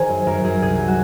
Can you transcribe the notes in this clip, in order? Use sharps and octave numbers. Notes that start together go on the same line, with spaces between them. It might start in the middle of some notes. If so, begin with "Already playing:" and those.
Already playing: D#3 G#4 A#4 C5 A#5
F#2
F#2 A#4
F#2 G#4
C2 G#4
F#3
F#4